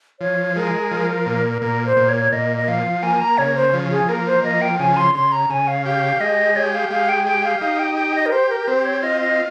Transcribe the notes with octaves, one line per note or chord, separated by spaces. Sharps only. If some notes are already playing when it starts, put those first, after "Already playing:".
F3 C#5
G#3 A#4
F3
A#2
A#2 A#4
C5
A#2
C#5
C#5
A#2 D#5
D#5
F3 F5
A#3 G#5
A#5
C#3 C#5
C5
F3
G#4
A#3 A#4
C5
F3 D#5
G5
C#3 G#5
C6
C#3 C6
A#5
C#3 G#5
F5
G4 F5
G#3 D#5
G4 C#5
F5
G#3 F5
G5
G4 G5
F5
D#4 F5
G5
G4 G5
D#5
A#4
G4 C5
A#4
A#4
C4 C5
C#5
F4 D#5
D#5